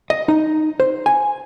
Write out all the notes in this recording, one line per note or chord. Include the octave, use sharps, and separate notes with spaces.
D#5
D#4
C5
G#5